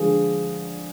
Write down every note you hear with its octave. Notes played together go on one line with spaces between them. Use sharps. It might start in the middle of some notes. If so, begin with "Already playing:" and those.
Already playing: D3 F3 G#3 G#4